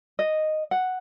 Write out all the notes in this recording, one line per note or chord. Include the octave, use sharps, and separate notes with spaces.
D#5
F#5